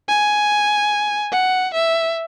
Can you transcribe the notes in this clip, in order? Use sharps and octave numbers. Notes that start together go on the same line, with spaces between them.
G#5
F#5
E5